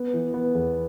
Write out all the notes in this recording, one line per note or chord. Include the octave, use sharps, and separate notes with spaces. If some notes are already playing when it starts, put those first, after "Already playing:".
Already playing: B3
E3
B3
E2